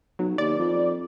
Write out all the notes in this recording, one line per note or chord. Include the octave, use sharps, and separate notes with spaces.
B1 F#3
D#2 D5
F2